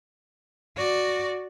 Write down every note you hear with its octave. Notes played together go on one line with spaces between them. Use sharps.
F#4 D5